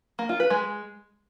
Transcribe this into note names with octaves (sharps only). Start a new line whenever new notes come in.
A#3
F4
B4
G#3